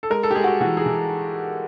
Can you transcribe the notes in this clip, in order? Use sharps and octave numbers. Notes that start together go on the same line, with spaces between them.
A4
G#3 A#4
A4
G4
G#3 G#4
F#4
G4
E3 F#4
G#4
E3